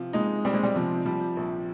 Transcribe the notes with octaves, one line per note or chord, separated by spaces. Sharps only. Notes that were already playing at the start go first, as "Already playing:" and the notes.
Already playing: C3 F3
G#3 D#4
G3 C4
G#3
G3
C3 F3
F3 G3
A#1